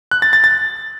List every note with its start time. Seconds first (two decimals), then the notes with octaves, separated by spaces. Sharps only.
0.11 F#6
0.22 A6
0.33 A6
0.44 A6